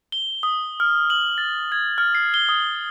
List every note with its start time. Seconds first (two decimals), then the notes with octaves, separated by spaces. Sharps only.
0.12 G7
0.43 D#6
0.80 F6
1.10 F#7
1.38 A6
1.72 G#6
1.98 F6
2.15 C7
2.34 G7
2.49 D#6